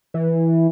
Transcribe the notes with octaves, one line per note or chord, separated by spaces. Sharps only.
E3